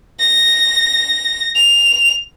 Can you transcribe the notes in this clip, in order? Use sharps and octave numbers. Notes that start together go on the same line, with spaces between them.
A#6
F7